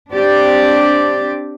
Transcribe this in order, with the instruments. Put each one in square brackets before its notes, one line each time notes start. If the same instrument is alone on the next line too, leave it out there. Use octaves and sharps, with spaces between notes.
[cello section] C4 D4 G4 D5